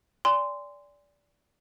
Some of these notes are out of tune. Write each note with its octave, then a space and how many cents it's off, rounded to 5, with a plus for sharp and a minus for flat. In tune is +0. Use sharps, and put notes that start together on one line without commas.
D5 -20 G#5 -35 C6 -15